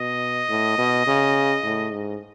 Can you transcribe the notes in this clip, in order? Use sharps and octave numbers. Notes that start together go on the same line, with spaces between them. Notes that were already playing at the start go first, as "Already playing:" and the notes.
Already playing: B2 D#5
A2
B2
C#3
A2
G#2